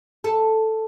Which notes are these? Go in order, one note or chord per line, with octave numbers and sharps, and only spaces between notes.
A4